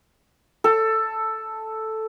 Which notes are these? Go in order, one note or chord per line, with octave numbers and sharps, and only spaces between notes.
A4